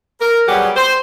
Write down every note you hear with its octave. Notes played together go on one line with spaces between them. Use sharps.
A#4
F#3 G3 B3 G4 G#4 F#5
C5